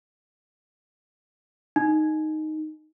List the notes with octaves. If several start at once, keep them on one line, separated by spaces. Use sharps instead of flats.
D#4